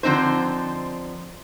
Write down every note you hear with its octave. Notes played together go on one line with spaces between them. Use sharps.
D3 F3 C4 D#4 C5